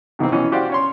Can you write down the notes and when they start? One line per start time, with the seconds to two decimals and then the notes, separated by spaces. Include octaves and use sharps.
0.19 C3 D#3 E3 A#3 C4
0.32 B2 E3 C#4
0.52 F#4 G4 C5 D5 F5
0.70 C#4 C#5 C6